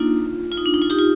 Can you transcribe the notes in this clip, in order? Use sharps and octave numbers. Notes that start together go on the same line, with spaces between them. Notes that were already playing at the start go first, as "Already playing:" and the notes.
Already playing: A#3 D4 D#4 F4
F4
D#4
D4
D#4
F4
D#4 G4
F4